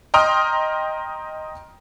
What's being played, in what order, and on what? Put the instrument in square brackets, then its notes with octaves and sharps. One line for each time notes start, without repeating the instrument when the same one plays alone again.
[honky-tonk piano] D#5 G5 A#5 C6 D#6 F6